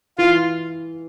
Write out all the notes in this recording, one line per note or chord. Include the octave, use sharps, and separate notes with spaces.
E3 F4